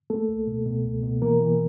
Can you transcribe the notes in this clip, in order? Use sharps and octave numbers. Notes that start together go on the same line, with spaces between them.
A3 A#3 A4
C#2
B2
B2
C#2
B2
E3 A#3 A#4
E3